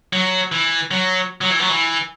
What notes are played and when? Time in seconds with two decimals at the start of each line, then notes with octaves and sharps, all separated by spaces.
0.13 F#3
0.52 E3
0.91 F#3
1.41 F#3
1.50 E3
1.60 F#3
1.69 E3